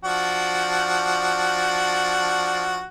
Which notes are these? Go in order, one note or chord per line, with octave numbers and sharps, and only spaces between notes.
F3 D4 F#4